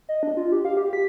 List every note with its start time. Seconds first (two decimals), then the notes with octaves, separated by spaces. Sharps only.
0.09 D#5
0.23 D4
0.37 F4
0.52 G4
0.65 F5
0.77 G4
0.93 B6